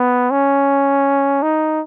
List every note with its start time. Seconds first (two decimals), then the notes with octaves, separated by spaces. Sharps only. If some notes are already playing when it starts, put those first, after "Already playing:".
Already playing: B3
0.31 C#4
1.42 D#4